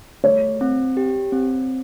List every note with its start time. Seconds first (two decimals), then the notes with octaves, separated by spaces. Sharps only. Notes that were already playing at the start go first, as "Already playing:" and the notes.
0.24 A3 C#5
0.61 C4
0.97 G4
1.32 C4